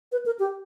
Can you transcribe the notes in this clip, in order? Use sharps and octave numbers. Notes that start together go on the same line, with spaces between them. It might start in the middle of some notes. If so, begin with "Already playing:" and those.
B4
A#4
G4